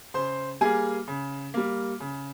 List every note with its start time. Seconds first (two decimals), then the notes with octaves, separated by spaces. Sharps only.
0.14 C#3 C5 C6
0.61 G3 A#3 G#4 G#5
1.08 C#3
1.54 G3 A#3
2.00 C#3